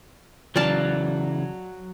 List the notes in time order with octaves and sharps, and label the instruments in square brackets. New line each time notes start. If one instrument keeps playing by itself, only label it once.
[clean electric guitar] C#3 E3 [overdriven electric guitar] F#3 [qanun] D5 F5 A5